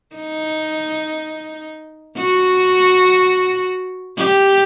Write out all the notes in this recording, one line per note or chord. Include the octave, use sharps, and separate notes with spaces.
D#4
F#4
G4